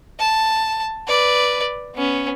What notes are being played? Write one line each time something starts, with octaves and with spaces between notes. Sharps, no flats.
A5
B4 D5
B3 C#4